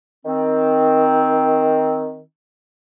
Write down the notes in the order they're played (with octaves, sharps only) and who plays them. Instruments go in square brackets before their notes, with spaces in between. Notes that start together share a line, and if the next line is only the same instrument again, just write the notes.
[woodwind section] D#3 C4